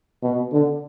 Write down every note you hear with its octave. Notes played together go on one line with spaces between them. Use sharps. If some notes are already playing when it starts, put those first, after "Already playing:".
B2
D3